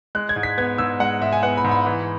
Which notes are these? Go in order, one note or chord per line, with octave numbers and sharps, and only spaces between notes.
G#3 F#6
G#6
G#2
B6
B3 G#6
G#2 E6
G#3 F#5
G#2 E5
G#5
B3 F#5
B5
G#2
B5
E3